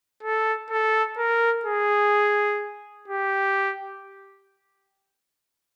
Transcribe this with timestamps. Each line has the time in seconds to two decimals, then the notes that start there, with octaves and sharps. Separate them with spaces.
0.23 A4
0.70 A4
1.18 A#4
1.65 G#4
3.08 G4